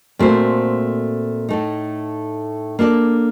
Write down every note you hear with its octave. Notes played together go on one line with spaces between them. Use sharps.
A#2 A3 C4 F#4 C5
A2 A3 D#4
A#3 D4 A4 D5